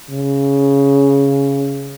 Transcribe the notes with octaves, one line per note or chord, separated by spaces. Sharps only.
C#3